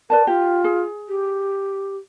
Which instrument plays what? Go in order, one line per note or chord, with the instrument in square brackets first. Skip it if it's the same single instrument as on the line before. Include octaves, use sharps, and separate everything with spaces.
[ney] A#4 [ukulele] B4 D5 A5
[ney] F4 [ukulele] G4
[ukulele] G#4
[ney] G4